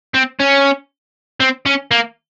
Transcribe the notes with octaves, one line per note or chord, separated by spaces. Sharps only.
C4
C#4
C4
C#4
A#3